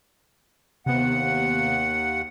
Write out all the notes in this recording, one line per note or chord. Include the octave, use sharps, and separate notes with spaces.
D#2 C3 B3 F#5